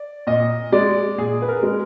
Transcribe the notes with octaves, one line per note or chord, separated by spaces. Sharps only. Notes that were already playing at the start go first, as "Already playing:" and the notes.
Already playing: D5
A#2 D#5
G#3 D5
A#2 G#4
B4
A#4
G#3